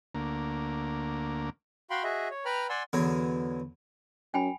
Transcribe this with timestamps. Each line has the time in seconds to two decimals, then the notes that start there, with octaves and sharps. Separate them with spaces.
0.15 D2 A#3
1.90 F#4 F5 G5 B5 C6
2.04 F#4 G#4 D#5 E5
2.31 C#5
2.45 B4 G5 A#5 B5 F6
2.69 D5 F#5 G#5 C6 E6
2.93 E2 D3 F#3
4.34 F#2 G5 G#5 B5